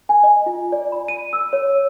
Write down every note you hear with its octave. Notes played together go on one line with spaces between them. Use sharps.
G#5
D#5
F4
D5
B5
D#7
E6
C#5